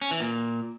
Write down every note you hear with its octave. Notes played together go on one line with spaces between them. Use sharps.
C#4
E3
A#2